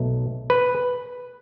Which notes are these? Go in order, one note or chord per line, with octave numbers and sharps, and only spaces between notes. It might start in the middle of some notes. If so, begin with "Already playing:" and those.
Already playing: B1 B2 A3
B4